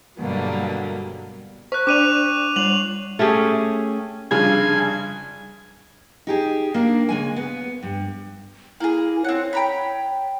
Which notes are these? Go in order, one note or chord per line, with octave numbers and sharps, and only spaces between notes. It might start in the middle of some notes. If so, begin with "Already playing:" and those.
G2 B2 D3 F#3 G3 A#3
C5 C#6 F#6
D4 D5 D6 D#7 F7
G3 C#5 F7 F#7
A3 C#4 G4 G#4
F1 C#3 G3 D4 G#5
D#4 G4 G#4
A#3 D4
C#3 G#3 G#5
B3
G2
A#3 E4 G#4
C4 C#5 F#5
G5 A#5 B5